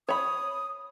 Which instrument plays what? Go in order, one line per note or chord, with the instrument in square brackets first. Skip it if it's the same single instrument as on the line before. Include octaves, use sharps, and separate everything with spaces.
[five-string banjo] C#5 B5 [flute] D#6